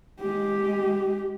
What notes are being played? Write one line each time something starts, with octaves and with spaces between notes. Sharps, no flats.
G#3 G4